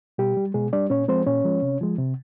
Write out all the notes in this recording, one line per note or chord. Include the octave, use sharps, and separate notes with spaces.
B2 G3 G4
G3
B2 G#3 G#4
G3 D4 D5
A#2 C#4 C#5
F3 G#3 C4 C5
A#2 C#4 C#5
F3 G#3
C3
F3 G#3
C3